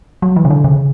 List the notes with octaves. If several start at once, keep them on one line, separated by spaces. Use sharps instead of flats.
F#3
E3
C#3
D3
C#3